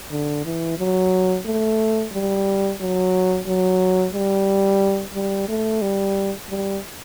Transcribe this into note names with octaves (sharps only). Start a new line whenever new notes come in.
D3
E3
F#3
A3
G3
F#3
F#3
G3
G3
A3
G3
G3